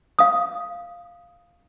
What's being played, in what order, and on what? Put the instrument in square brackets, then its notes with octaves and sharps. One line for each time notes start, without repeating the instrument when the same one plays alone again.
[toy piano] F5 D#6